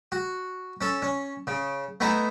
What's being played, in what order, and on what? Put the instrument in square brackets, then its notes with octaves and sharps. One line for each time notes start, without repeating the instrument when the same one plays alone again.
[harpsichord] F#4
C#4 A4
C#4
C#3
A3 B3 D#4 E4 G#5